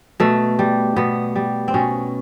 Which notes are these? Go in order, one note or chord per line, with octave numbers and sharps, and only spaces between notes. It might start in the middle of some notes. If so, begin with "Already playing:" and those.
B2 A3
G3
B2 B3
G3
C4
B2 C#4